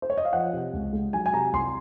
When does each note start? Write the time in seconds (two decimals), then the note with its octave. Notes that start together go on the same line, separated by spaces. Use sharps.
0.02 C5
0.10 C#5
0.18 D#5
0.25 F5
0.33 F3 F#5
0.53 C3
0.73 C#2
0.93 G#3
1.13 F#3 G#5
1.26 G#5
1.33 C3 A#5
1.53 C2 C6